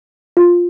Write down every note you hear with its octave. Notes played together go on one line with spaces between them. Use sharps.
F4